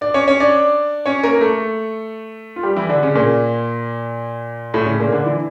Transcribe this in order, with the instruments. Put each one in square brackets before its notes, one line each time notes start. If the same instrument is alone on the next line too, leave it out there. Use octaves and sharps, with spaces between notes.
[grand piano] D4 D5
C#4 C#5
C#4 C#5
D4 D5
C#4 C#5
A#3 A#4
A#4
A3 A4
F4
G3 G4
E3 E4
D3 D4
C#3 C#4
A#2 A#3
A2 A3
C#3 C#4
A#2 A#3
D3 D4
E3 E4